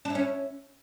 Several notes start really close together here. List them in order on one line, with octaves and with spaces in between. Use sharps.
D4 E4 C#4